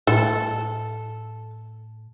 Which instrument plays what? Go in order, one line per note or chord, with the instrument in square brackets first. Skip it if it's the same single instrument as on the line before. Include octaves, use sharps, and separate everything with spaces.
[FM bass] A2 [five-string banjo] A4